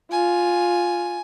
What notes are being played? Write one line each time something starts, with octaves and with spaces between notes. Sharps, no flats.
F4 G#5